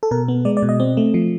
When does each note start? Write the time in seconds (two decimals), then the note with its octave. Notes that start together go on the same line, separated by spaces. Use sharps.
0.03 A4
0.11 B2 A#4
0.28 B3
0.45 G#3 D5
0.57 D5
0.62 B2
0.69 D#5
0.80 C4
0.97 A3
1.14 F3